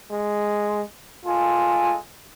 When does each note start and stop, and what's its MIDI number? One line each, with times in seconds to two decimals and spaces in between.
0.11 0.81 56
1.25 1.98 56
1.25 1.96 65
1.25 1.98 69
1.25 1.98 80